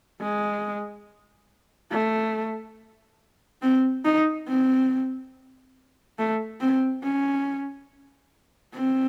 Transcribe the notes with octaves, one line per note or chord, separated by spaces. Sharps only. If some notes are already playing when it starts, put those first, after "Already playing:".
G#3
A3
C4
D#4
C4
A3
C4
C#4
C4